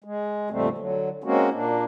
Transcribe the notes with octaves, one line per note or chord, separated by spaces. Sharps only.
G#3
F2 A#2 D3 G3 A3 C4
D3 F#3
G#3 A#3 C4 C#4 F#4
A#2 A#3 D4